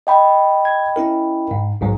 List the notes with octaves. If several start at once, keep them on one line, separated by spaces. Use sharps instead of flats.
D#5 G5 B5
G#6
C#4 E4 A#4
G#2
A#1 G#2 F#3